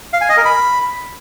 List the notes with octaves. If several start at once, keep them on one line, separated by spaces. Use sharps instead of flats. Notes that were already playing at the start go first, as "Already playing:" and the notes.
F5
G#5
D#5
A#4
B5